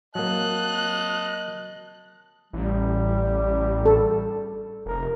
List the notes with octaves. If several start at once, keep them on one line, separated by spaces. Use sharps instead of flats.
F#3 A#3 D#5 A5 F#6
A1 G3
A4
F1 A#4